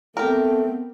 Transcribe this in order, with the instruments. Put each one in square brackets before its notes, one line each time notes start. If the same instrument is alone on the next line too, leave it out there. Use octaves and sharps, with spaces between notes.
[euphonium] A3 [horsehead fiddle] B3 C4 [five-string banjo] G4 A#4